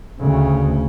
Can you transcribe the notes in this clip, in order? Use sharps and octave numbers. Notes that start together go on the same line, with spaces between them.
D2 C#3